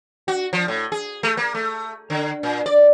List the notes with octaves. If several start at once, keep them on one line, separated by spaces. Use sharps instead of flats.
F#4
F3
A2
G#4
A3
A#3
A3
D3
A#2
D5